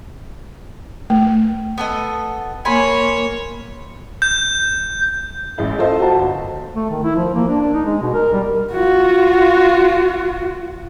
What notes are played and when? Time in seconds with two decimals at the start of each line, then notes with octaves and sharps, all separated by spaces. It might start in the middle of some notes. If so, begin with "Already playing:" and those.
1.10 A3
1.78 B3 A4 D#5
2.65 A#3 C#5 G#5 B5 C6
4.22 G6
5.58 A1 G#3 E4
5.78 F4 A4 C5 D#5
6.00 F#4 A5
6.16 G1
6.76 A3
6.90 D#3
7.04 E4
7.15 F3
7.35 A#3
7.48 D4
7.61 D4
7.74 D#4
7.86 G#3
8.01 B2
8.14 A#4
8.33 G3
8.73 F4 F#4